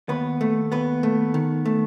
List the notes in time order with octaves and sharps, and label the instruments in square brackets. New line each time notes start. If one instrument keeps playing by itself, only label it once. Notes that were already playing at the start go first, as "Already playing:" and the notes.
[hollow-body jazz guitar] D#2 B3 B4
A3
D#2 B3 B4
A3
D#3
A3